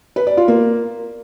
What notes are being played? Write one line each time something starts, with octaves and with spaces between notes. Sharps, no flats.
B4
D5
F4
A#3